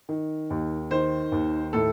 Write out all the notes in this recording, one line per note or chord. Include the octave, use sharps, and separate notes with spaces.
D#3
D#2
D#3 C5
D#2
A2 A4